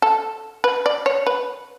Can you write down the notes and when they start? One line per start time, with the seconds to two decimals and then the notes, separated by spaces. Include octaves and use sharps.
0.02 A4
0.64 B4
0.86 D5
1.06 C#5
1.27 B4